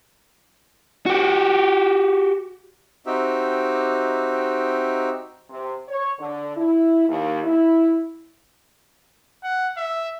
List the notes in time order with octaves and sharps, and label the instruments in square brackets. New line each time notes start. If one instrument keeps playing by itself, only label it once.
[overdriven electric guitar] F#4 G4
[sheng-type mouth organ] C4 D#4 F#4 G4 E5
[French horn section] C3
C#5
D3
E4
D#2
E4
[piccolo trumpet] F#5
E5